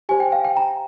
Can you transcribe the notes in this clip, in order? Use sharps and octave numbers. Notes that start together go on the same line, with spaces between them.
G4 C5 G#5
G5
F5
G5
A#5